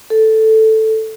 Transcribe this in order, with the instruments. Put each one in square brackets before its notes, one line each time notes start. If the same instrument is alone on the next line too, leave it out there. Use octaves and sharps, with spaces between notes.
[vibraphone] A4